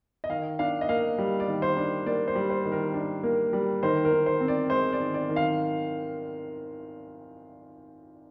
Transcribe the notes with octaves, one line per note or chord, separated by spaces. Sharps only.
D#5
D#3 F5
D4 F5
D#5
A#3 F5
G3
D5
D#3
C5
D4
A#3 D5
C5
G3
C5
D#3
A#4
D4
A#3
G3
D#3 C5
A#4
D#3
C5
C4
D5
G#3 C5
D5
D#3
D5
D#3
F5